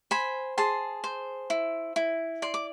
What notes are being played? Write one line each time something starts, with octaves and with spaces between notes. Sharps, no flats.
C5 G#5 B5
G#4 A5 C6
C5
E4
E4
D5 C6
D6